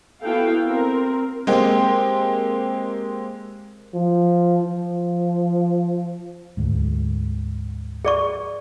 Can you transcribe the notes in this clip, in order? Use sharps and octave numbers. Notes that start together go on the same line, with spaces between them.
B3 E4 F#4 A4 F5 G5
C4 A#4
G#3 A#3 C4 G4
F3
F3
D2 G#2
G#4 D5 C#6